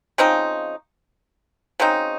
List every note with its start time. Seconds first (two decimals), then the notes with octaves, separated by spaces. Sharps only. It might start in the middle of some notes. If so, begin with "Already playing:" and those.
0.18 C#3 F3 C4 D#4
1.80 C#3 F#3 C4 D#4